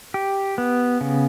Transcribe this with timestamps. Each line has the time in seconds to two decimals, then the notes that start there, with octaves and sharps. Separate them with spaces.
0.14 G4
0.58 B3
1.01 C#3